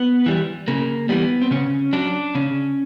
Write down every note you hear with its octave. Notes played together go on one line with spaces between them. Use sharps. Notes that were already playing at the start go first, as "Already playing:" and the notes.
Already playing: B3
E3 G3
C#3 A#3
E3 G3 B3
C4
C#3 C#4
F#3 D4
C#3 C#4